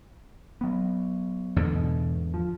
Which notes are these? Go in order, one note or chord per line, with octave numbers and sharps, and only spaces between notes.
F#3 B3
E2 G#2 D3
B2
F3